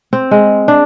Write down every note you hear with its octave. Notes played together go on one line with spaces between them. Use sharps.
C4
G#3
D4